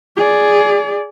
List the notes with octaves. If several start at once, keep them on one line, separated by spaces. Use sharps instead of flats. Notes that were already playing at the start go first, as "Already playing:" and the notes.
G#4 D5